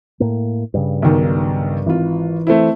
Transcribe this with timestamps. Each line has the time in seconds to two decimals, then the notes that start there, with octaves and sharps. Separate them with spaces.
0.20 A2 A#3
0.74 G2 C#3
1.02 B1 D#3
1.86 G#1 E3 F4
2.47 A3 C4 E4